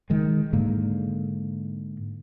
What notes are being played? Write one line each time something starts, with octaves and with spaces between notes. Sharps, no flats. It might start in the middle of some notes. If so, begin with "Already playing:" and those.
D#3 G#3
G#2 D3 A#3